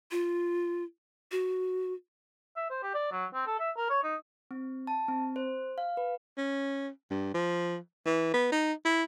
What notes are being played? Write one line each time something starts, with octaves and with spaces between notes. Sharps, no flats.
F4
F#4
E5
C5
G4
D5
F#3
C4
A4
E5
A#4
C#5
D#4
C4
A5
C4
C5
F5
B4
C#4
G2
F3
E3
B3
D#4
E4